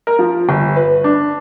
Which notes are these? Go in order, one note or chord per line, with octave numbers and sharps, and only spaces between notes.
A#4
F3
G1
B4
D4